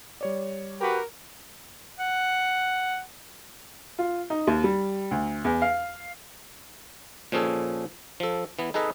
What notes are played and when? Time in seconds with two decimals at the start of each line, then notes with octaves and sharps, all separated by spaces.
0.21 G3 C#5 D5
0.81 F#4 G4 A#4 B4
1.99 F#5
3.99 F4
4.30 D#4
4.47 D#2
4.64 G3
5.11 D2
5.45 E2
5.62 F5
7.32 A#2 F3 C#4 G#4 A4
8.20 F3 A4
8.59 E3 B3
8.74 D#4 G#4 A4 B4 D#5